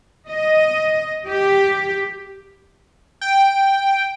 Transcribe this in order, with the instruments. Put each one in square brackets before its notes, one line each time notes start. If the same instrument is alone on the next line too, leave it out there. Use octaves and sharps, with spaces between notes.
[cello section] D#5
G4
[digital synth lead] G5